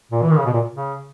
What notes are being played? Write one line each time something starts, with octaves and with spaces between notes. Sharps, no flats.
A#2
E3
D#3
C#3
B2
A#2
C#3